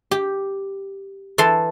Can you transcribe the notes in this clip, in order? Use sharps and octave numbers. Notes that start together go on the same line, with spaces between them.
G4
E3 A4 A5 C6